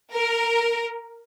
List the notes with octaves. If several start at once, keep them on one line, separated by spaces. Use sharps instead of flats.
A#4